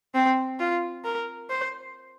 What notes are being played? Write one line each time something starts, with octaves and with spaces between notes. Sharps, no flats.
C4
F4
A#4
C5